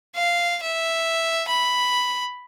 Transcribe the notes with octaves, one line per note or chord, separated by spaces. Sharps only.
F5
E5
B5